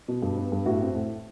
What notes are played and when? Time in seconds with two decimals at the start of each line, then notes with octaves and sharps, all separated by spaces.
0.08 B2
0.22 G2
0.37 B3
0.52 G2
0.66 A2 F#4
0.81 C4
0.95 A2